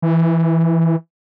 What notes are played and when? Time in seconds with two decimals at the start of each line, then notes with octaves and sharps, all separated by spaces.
0.02 E3